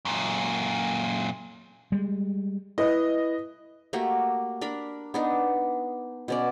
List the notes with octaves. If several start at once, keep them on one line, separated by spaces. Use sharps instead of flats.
F#2 A#2
G3 G#3
E4 B4 D#5
A3 A#3 F#4 G4
D4 A#4 B5
B3 D4 D#4
B2 C#4 D5